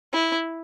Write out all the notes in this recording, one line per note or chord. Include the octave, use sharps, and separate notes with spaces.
E4